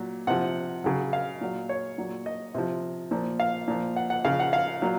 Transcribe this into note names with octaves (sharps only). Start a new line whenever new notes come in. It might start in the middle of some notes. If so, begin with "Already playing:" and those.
Already playing: A#2 F#3
C3 F3 F#5
C#3 F#3
F5
A#2 F#3
C#5
A#2 F#3
D#5
C3 F3
A#2 F3
F5
A#2 F3
F#5
F#5
C#3 F3 F5
F#5
F5
A#2 F#3